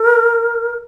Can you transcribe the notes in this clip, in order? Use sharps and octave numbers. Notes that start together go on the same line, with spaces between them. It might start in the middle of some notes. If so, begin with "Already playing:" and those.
Already playing: A#4